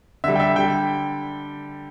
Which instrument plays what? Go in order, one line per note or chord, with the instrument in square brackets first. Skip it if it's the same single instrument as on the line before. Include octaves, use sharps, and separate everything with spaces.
[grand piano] D3 G3 E5
G5
E5
D3 G3 G5